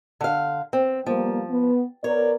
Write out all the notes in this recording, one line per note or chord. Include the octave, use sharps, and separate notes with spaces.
D3 F5
C4
F3 G3 A#3 B3
B3
B3 A#4 C#5 D5